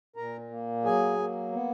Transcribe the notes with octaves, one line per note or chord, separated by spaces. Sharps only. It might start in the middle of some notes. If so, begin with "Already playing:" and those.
A#2 A#4 A#5
A#3
F#3 G#4 G#5
A#3
B3